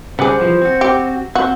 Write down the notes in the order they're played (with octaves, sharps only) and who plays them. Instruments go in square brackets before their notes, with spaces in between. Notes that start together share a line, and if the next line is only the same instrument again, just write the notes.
[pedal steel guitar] C#3 F#5 D6 [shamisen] G3 G#4 [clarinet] C5
[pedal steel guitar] E3 F3
C4 F#4
[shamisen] G4
[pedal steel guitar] C4 [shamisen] F#4